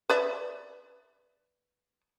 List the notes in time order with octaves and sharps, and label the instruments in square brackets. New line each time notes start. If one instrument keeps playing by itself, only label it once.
[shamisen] B4 D5 E5